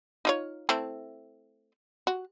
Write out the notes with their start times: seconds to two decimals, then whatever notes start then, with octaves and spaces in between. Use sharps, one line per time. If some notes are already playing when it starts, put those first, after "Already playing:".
0.25 D#4 F4 C#5
0.69 A3 C4 E4
2.07 F#4